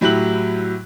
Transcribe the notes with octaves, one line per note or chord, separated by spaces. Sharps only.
A2 F#3 E4 G4 F#6 F#7